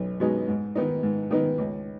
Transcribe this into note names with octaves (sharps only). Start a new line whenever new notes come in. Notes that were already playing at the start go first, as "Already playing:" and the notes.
Already playing: B1 B3 D#4
B2 G#3 B3 D#4
G#2
D#3 B3 D#4
G#2
D#3 B3 D#4
C#2